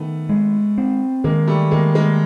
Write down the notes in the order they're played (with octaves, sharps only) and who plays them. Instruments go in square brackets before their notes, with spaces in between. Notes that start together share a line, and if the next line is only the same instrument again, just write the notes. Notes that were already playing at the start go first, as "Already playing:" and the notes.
Already playing: [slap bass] D#3 [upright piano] A3 B3
[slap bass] G#3
C4
[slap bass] D#3 [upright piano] G#3 A#3
[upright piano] G3 A3
[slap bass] D#3 [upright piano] G#3 A#3
[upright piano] G#3 A#3